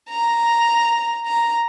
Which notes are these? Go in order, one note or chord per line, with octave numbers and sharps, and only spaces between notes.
A#5
A#5